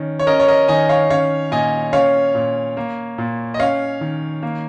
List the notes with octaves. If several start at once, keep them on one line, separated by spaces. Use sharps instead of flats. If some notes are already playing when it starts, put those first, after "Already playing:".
Already playing: D#3 C#4
C#5
C#4 A#4 D#5
C#5
A#4 D#5
D#3 D#5 G#5
C#5 F5
C#4 C#5 F5
A#2 D#5 G#5
C#4 C#5 F5
A#2
A#3
A#2
D#5
C#4 C#5 F5
D#3
A#3